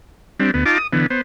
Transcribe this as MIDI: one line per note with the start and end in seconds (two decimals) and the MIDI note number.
0.40 0.51 55
0.40 0.51 60
0.40 0.51 62
0.54 0.64 38
0.54 0.64 59
0.66 0.78 63
0.66 0.78 65
0.66 0.78 81
0.66 0.78 86
0.78 0.87 87
0.93 1.06 50
0.93 1.06 52
0.93 1.06 59
1.10 1.21 59
1.10 1.21 72